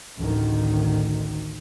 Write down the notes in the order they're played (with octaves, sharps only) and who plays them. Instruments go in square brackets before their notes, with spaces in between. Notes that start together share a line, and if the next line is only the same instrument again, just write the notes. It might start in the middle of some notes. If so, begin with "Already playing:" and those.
[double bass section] A1 D2 D#3